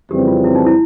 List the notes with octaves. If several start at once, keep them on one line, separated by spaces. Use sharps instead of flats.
F2 C#3 E3 G3 C4 G4
F4
E4
D#4
E4